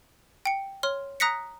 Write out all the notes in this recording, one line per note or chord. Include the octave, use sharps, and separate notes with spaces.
G5 C#7
C#5 C6 F6
A#5 D#6 F#6 A#6 B6 C#7